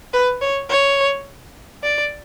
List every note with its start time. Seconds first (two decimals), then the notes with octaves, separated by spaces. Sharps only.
0.13 B4
0.41 C#5
0.70 C#5
1.83 D5